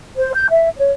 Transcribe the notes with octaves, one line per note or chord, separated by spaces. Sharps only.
C5
G6
E5
C#5